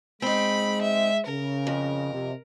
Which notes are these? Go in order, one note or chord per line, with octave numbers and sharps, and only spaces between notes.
G#3 C4 D#4 B5
E5
C#3 A#4
F2
C3